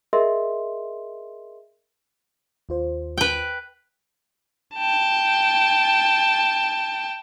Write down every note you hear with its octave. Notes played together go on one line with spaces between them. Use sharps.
G#4 A#4 D#5 E5 C6
D#2 F4 C5
B4 G5
G5 A5